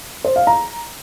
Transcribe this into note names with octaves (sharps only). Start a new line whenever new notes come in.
C5
F5
A#5